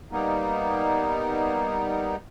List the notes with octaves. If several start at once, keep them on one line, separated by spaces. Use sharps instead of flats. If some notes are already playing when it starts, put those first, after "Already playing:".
G3 A#3 B3 D#4